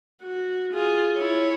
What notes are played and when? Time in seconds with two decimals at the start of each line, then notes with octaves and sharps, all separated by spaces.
0.22 F#4
0.73 F4 G#4
1.17 E4 C#5